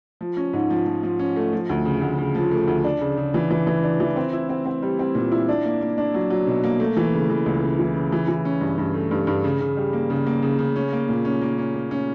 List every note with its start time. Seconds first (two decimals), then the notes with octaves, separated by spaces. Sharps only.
0.21 F3
0.37 C#4
0.53 G#2
0.70 F3
0.86 F3
1.03 F3
1.19 C#4
1.36 A3
1.53 F3
1.69 D2
1.85 C#3
2.01 D2
2.18 C#3
2.35 F3
2.51 A3
2.68 D2
2.84 D4
3.01 C#3
3.17 C#3
3.34 E3
3.50 E3
3.67 E3
3.84 D4
4.00 E3
4.16 C4
4.33 E4
4.49 C4
4.66 C4
4.82 G3
4.99 C4
5.15 A#2
5.32 E4
5.49 D4
5.65 A#3
5.81 A#3
5.98 D4
6.14 F#3
6.30 F#3
6.47 B2
6.64 A#3
6.80 A3
6.97 E3
7.13 C#3
7.30 E3
7.46 C#2
7.62 C#3
7.79 E3
7.95 C#3
8.12 E3
8.28 E3
8.45 C#4
8.61 G2
8.78 G2
8.94 A3
9.11 G2
9.27 G2
9.44 C#3
9.60 C#3
9.77 G3
9.93 A#3
10.10 C#3
10.27 A#3
10.42 C#3
10.59 C#3
10.76 C#4
10.92 A#3
11.09 A#2
11.25 C#4
11.42 A#3
11.58 C#4
11.74 A#3
11.91 C#4